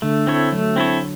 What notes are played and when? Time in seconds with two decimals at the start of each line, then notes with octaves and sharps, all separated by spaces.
0.02 D3 A3
0.27 C4 E4 A4 C#5
0.52 F#3 A3
0.76 C4 E4 A4 C#5